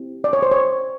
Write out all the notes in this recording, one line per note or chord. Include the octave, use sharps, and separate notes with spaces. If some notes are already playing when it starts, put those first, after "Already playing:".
Already playing: C4 E4 G4
D5
C#5
C5
C#5